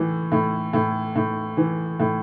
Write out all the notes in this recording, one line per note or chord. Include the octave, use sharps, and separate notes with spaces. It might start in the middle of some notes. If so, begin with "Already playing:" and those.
Already playing: A2 E3
A2
A2
A2
E3
A2